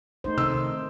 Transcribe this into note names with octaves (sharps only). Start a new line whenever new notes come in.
A3 D#4 C5
C3 D#3 E6